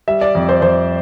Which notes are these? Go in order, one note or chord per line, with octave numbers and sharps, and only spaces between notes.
G3 E5
D5
F2
C5
F2 C5